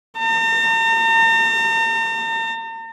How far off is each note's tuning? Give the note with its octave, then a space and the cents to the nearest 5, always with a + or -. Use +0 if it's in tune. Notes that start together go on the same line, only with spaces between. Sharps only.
A#5 -45